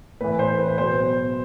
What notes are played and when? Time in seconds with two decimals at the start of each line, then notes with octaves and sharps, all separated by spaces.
0.21 A2 E3 B4
0.39 C5
0.59 B4
0.78 B2 F#3 C5